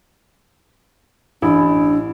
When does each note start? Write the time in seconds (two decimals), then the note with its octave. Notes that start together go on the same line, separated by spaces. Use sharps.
1.42 A1 D4 E4